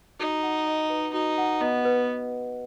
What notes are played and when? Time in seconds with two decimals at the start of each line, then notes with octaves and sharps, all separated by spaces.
0.20 D#4 F#4
0.43 F#5
0.67 D#5
0.90 B4
1.13 D#4 F#4
1.38 F#5
1.61 B3 D#5
1.85 B4